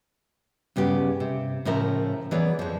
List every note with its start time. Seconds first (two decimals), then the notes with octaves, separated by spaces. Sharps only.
0.76 G2 C#3 B3 G4
1.20 C3
1.65 A2 C#3 F3 A#4 E5
2.31 E3 B3 G#4 C#5 D5
2.59 F2 F3